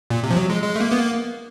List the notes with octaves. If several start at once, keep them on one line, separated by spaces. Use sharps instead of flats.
A#2
C3
F3
F#3
G#3
G#3
A3
A#3
B3
A#3